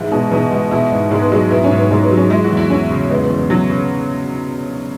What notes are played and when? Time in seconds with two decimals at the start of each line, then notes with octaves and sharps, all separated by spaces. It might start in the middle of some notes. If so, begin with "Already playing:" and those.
Already playing: G#2 E3 G#3 E4
0.11 B2 G#4
0.31 B2 E3
0.51 G#3
0.71 B2 E4
0.91 G#2
1.10 G#2 G#3
1.22 B3
1.31 F#3 G#3
1.51 B3 E4
1.64 C#4
1.70 G#2
1.78 B3
1.91 G#2 G#3
2.04 B3
2.11 F#3
2.17 C#4
2.30 G#3 E4
2.44 F#4
2.51 E2
2.57 E4
2.70 E2 C#4
2.90 C#3
3.10 G#3 B3
3.24 B3
3.30 E2
3.37 B3
3.50 E2 F#3
3.69 C#3